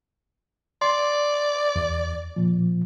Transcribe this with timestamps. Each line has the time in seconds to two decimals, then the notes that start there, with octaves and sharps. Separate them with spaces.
0.82 D5 C6
1.76 E2
2.36 A#2 F3